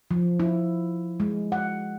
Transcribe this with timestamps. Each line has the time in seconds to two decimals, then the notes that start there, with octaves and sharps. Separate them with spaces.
0.11 F3
0.40 E4
1.20 G#3
1.52 F#5